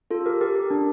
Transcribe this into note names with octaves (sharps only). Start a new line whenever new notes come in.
F4 A4
G4 A#4
G4 A#4
G4
D4